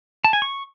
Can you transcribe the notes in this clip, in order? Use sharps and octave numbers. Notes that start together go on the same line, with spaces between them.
A5
G#5
C#6